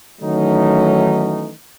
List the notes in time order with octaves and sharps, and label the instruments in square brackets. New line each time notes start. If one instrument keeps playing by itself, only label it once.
[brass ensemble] D#3 E3 F#3 A3 C#4 D#4